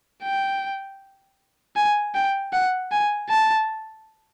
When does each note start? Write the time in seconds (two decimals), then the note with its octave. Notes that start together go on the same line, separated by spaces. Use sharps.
0.23 G5
1.76 G#5
2.15 G5
2.53 F#5
2.91 G#5
3.30 A5